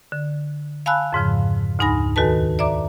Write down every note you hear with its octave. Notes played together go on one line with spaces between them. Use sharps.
D3
F5 G#5 A5 B5 E6 F#6
F2 G#2 C#3 F3
D2 G#2 D#4 G#5 B5 A#6
E2 D#3 F#4 A4 B4 A5
D5 E5 A#5 D6